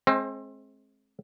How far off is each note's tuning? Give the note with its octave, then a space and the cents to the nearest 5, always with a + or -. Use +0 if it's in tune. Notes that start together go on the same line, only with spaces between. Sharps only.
G#3 +30 C4 +30 C5 +0